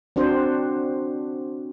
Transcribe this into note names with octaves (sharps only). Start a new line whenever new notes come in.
C4 D4 F#4 C5